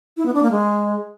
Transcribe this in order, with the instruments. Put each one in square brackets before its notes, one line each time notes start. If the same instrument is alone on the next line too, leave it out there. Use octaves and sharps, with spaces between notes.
[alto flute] E4
B3
D4
A#3
G#3